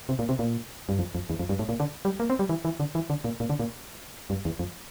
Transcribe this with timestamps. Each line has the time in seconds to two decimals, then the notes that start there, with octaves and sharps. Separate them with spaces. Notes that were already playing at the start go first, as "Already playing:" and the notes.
0.09 C3
0.19 A#2
0.29 C3
0.39 A#2
0.89 G2
0.99 F2
1.15 F2
1.30 E2
1.39 F2
1.49 G2
1.59 A2
1.69 A#2
1.80 D3
2.05 G3
2.20 A#3
2.30 C4
2.39 G3
2.49 E3
2.65 E3
2.80 D3
2.95 E3
3.10 D3
3.24 A#2
3.40 A#2
3.50 D3
3.59 A#2
4.30 G2
4.45 E2
4.59 F2